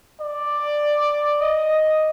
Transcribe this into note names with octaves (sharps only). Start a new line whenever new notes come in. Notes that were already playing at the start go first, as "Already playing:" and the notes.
D5
D#5